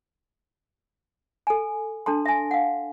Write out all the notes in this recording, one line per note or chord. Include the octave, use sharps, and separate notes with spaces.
A4 G#5
D4 A4 A5 C6
E5 G#5
F5 F#5